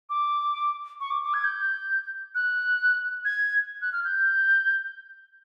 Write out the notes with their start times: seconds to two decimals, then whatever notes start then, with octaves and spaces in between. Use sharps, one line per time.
0.10 D6
1.00 C#6
1.10 D6
1.23 D6
1.34 G#6
1.44 G6
2.35 F#6
3.25 G#6
3.82 F#6
3.93 F6
4.05 G6